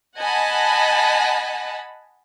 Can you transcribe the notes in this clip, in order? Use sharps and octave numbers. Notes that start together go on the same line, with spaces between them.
D#5 F#5 G#5 A5 B5